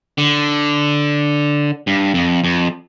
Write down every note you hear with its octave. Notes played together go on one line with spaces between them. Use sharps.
D3
G2
F2
F2